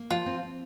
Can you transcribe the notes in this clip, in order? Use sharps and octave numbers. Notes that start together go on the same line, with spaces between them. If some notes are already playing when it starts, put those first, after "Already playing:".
Already playing: A#3
F3 F4
C4
C4